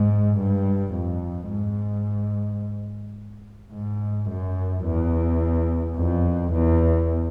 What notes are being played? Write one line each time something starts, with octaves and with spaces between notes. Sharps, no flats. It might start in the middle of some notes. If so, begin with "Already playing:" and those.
Already playing: G#2
G2
F2
G#2
G#2
F#2
E2
F2
E2